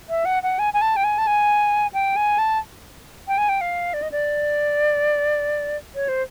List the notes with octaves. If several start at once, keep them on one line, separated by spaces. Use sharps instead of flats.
E5
F#5
F#5
G#5
G#5
A5
G5
G#5
A5
G#5
G5
G#5
A5
G5
G#5
G5
F5
D5
D#5
D5
C#5
C5